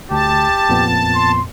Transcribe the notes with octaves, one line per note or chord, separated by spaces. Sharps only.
D2 G4 A5
F2 A#2 B3
C6